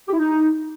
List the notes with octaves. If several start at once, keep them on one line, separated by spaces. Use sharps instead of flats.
G4
E4
D#4